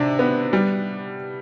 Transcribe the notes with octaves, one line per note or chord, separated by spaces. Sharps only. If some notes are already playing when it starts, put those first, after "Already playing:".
Already playing: C3 D4
B3
G3